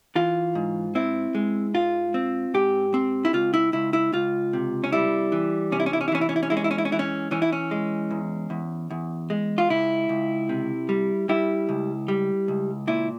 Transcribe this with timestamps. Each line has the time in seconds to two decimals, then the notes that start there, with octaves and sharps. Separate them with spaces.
0.15 E3 F4
0.55 G#2
0.95 C4 E4
1.35 G#3
1.74 G#2 F4
2.14 C4
2.54 G#2 G4
2.94 C4
3.25 E4
3.33 C#2 F4
3.54 E4
3.73 C#2 E4
3.93 E4
4.13 C#2 F4
4.53 C3
4.84 C#4
4.92 G3 E4
5.32 E3
5.72 C3 C#4
5.80 E4
5.86 C#4
5.93 E4
6.01 C#4
6.08 E4
6.12 E3 C#4
6.21 E4
6.29 C#4
6.36 E4
6.43 C#4
6.50 G#3 E4
6.57 C#4
6.64 E4
6.71 C#4
6.78 E4
6.85 C#4
6.92 E3 E4
6.99 C#4
7.31 E3 C#4
7.42 E4
7.53 C#4
7.71 G#3
8.11 E2
8.50 E2
8.90 E2
9.30 G#3
9.58 F4
9.69 C#2 E4
10.09 C#2
10.49 C3
10.89 G3
11.29 G3 E4
11.69 C#2
12.08 G3
12.48 C#2
12.87 A#2 E4